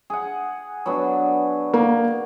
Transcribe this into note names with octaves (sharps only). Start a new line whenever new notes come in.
G#4 F#5
F#3 B3 D4
A#3